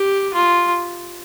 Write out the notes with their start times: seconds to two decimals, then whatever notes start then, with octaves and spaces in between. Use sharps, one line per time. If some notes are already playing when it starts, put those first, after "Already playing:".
Already playing: G4
0.33 F4